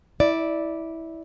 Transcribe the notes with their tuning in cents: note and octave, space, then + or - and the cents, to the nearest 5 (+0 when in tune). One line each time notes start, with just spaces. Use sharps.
E4 -15 D5 +0